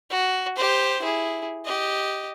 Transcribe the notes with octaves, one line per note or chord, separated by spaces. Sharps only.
F#4
G4 C5
E4 G#4
G4 D#5